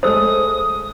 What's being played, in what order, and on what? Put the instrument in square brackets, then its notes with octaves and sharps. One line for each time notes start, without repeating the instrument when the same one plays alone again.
[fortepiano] G#3 A3 [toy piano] C5 E6 [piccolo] D#6